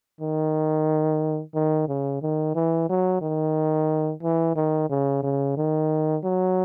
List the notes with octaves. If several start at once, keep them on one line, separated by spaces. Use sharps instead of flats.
D#3
D#3
C#3
D#3
E3
F#3
D#3
E3
D#3
C#3
C#3
D#3
F#3